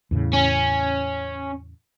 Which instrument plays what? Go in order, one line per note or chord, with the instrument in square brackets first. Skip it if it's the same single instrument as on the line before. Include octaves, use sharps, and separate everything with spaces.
[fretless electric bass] E2 A2 C#3
[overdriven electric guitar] C#4